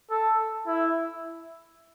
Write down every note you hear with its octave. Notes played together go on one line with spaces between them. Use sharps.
A4
E4